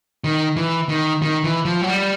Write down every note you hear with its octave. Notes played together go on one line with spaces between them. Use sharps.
D#3
E3
D#3
D#3
E3
F3
F#3
G3